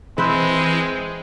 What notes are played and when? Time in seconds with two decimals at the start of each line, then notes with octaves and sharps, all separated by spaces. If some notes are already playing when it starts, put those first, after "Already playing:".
0.18 E3 G#3 C4 E4 B4 C5